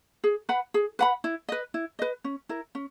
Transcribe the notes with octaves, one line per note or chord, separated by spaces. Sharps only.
G#4
B4 F#5 B5
G#4
B4 F#5 B5
E4
B4 D#5
E4
B4 D#5
C#4
E4 A#4
C#4